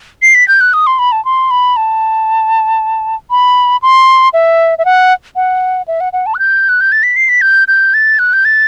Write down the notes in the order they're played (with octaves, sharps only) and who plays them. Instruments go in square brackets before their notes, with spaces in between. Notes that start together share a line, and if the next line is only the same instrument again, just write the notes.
[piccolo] C7
B6
G6
F#6
D#6
C6
B5
A5
C6
B5
A5
B5
C6
E5
E5
F#5
F#5
E5
F#5
F#5
A5
F#6
G6
F#6
G6
A6
B6
C7
B6
G6
G6
A6
F#6
G6
A6